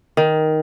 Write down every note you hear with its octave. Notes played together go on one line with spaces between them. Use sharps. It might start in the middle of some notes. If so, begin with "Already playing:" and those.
D#3